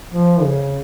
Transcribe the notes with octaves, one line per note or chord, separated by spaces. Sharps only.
F3
C#3